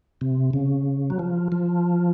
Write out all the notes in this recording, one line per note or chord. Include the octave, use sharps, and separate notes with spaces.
C3
C#3
F#3
F3
F3